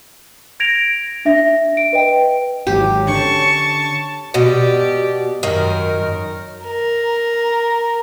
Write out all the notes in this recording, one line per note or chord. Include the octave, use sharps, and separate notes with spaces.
G#6 A#6 D7 F7
D4 E5 A#6
D7
B4 D#5 G5
G#1 F#3 G4
D3 C#4 A5 C#6
B2 G4 D5
F#2 D#3 A#4
A#4